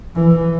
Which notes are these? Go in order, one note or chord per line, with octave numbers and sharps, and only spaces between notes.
E3